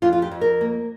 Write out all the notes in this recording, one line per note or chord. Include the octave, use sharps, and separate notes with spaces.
F2 F4
F4
G4
F2
A#4
A#3